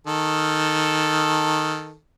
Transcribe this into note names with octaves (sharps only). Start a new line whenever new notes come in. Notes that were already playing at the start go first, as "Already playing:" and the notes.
D#3 A4